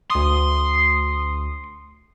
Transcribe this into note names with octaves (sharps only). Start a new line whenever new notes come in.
D2 C6 D#6